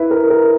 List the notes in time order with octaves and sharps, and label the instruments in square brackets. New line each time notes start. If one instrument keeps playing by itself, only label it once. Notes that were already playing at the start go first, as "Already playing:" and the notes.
Already playing: [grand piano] E4 B4
A#4
A#4